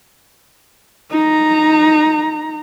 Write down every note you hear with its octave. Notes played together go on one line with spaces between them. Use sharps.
D#4 A#5